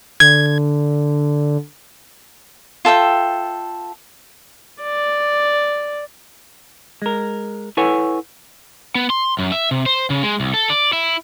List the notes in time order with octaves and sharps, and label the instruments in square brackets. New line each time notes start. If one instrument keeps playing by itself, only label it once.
[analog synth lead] D3 [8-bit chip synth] G#6
[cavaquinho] F4 A4 E5 G5
[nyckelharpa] D5
[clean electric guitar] G#3 A#4
E4 A4 B4 C#5 F#5 G#5
[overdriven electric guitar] B3
C6
F#2
E5
C3
C5
C#3
G#3
C2
A4
D5
E4